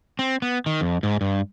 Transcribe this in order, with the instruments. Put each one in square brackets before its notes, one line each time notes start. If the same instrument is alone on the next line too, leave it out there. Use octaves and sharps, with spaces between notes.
[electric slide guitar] C4
B3
D#3
F2
G#2
G2